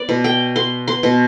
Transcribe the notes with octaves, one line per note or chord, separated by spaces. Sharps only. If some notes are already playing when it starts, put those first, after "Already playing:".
Already playing: B3 D5
B2
G5
B3 C6
C6
B2